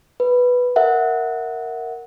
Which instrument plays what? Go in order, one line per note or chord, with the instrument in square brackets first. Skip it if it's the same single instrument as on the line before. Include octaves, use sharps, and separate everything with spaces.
[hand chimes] B4
A#4 E5 F#5